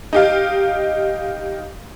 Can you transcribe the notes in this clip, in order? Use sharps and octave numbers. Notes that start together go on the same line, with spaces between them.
D#4 G4 F5